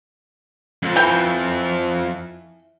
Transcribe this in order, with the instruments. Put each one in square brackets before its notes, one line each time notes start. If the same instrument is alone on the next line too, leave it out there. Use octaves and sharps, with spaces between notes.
[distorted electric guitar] F2
[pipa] E3 G5